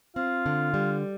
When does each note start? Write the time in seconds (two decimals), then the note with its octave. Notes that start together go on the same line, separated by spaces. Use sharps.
0.16 C4 F4
0.46 D3
0.74 G3